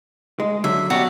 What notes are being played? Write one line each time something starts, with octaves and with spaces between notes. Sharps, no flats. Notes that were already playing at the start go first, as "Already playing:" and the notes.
G#3
D3 F#3 E5
B2 F#3 C#4 F#4 G4 D5